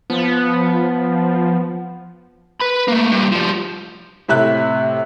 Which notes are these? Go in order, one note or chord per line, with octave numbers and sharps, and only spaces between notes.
F3 B3
B4 B5
A3 A#3
G2 A#2
F3 G3
A2 C3 E5 F#6